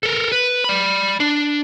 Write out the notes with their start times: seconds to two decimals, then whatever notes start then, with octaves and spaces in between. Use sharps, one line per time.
0.03 A4 A#4
0.32 B4
0.64 D5 B5
1.20 D4